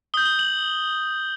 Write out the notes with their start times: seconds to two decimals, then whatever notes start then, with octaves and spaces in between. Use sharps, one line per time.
0.14 D#6 G6 G7
0.25 G7
0.39 F#7